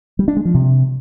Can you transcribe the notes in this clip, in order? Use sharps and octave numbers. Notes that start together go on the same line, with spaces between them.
G3
D4
G#3
F3
C3